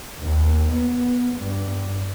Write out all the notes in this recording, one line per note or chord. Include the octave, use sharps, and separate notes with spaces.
D#2
B3
G2